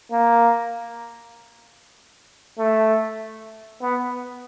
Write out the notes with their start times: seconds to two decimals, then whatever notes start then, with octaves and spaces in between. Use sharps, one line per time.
0.12 A#3
2.58 A3
3.81 B3